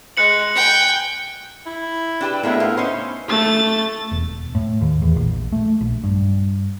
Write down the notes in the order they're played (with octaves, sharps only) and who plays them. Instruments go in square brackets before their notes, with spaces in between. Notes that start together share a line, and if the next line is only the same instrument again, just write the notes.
[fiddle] G#3 [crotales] F#6 C#7 F#7
[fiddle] G5 G#5
[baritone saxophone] E4
[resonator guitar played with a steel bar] D4 G4 B4 [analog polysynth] E6
[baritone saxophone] A2 [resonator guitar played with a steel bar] G#3 A#3 E4 [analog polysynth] B3 E5
[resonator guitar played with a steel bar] F4
[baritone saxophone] C#4 [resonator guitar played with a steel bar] D#4 C5
[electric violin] A3 A6
[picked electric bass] E1
A2
D#2
E2
A#1
A3
A#1
G2